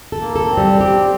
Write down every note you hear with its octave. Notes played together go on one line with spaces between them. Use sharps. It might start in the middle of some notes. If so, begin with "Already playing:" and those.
A4
A#3
A4
C4
G3
G4